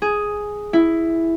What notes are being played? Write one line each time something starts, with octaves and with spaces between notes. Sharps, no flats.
G#4
E4